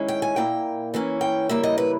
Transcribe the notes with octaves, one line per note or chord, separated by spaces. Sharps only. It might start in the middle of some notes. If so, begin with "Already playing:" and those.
Already playing: D#3 G#3 C#4 E4
G5
G#5
A#2 A#3 E4 G5
E3 A#3 C#4 E4
G5
C#3 G3 A#3 E4 E5
D#5
B4